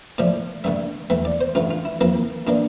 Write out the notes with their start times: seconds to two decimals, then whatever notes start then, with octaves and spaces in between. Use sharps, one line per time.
0.18 A2 F3 A3 D5
0.64 G2 D3 A3 E5
1.10 E2 E3 A3 E5
1.25 D5
1.41 C5
1.55 A1 G2 E3 A3 F4
1.71 F4
1.85 E4
2.01 F2 E3 A#3 E4
2.47 A2 E3 A#3 D4